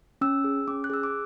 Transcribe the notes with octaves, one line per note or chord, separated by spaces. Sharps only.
C#4 E6
G#4
C#4 D6
F#6
G#4 E6
D6